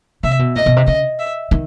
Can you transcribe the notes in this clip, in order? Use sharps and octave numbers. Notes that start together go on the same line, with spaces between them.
C3 E5
B2
A#2 D#5
B2
C3
C#3 D#5
E5
D#3